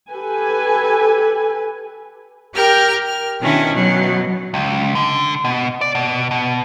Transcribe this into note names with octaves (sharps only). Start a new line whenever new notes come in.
G4 A4 B4 G#5
G4 A#4 G5 F6
F6
B2 D#3 C#4 D4 E4
B2 F#3
C#2
D3
B2
D5
B2
B2